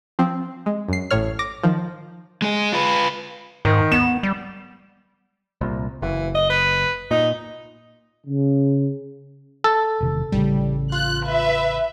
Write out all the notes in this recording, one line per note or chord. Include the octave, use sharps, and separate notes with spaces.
F3 C4
G#3
F#2 C7
A1 A2 C#5 F6
D6 A#6
D#3 F3
G#3 G#4
F4 B4
G#2 D#3
B3 E7
G3
C2 A#2
F#1 E3
D#5
B4
A#2 D#4
C#3
A4
E1 C3 D#3
A1 A2 C#3 G3
F4 F#6
B4 E5